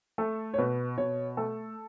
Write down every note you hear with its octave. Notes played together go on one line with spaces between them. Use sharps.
A3 A4
C#5
B2 B4
B2 C#5
A3 A4